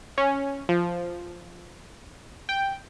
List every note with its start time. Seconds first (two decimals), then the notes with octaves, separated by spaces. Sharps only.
0.18 C#4
0.69 F3
2.49 G5